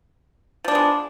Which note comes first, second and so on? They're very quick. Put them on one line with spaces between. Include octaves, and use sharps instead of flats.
F3 D4 B3 G#3